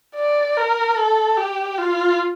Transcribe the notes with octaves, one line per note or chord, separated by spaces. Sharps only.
D5
A#4
A4
G4
F4